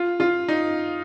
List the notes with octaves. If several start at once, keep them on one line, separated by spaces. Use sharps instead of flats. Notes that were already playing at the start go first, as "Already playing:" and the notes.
Already playing: F4
F4
D#4